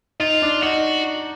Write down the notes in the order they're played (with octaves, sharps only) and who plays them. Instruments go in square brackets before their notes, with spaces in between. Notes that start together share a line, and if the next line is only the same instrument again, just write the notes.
[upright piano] D#4 [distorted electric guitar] F4
[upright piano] D4
[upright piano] D#4 [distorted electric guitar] F#4